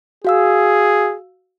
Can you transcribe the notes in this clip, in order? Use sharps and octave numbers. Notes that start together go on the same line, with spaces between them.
F#4 G#4 F5 E6